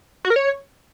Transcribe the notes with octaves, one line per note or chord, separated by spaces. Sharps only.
F#4
A#4
C#5